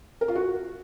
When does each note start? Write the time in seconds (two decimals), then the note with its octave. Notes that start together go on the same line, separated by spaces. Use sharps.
0.21 A#4
0.28 F4
0.35 F#4